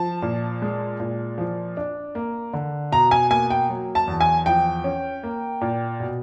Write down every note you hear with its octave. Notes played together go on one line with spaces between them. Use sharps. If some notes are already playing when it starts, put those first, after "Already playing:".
Already playing: F3 A5
A#2
G#3
A#2
F3
D4
A#3
D3
B2 A#5
G#5
A#3 G#5
G5
F#3
A5
E2
G#5
F3 G5
C#4
A#3
A#2
B2